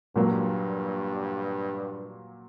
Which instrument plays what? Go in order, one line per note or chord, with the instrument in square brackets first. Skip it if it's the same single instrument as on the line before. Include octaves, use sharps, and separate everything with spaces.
[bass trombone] G2 [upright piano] A#2 F#3 A#3